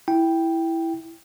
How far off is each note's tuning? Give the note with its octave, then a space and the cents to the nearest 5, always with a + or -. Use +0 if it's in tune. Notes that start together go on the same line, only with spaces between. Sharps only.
E4 +0 G5 +0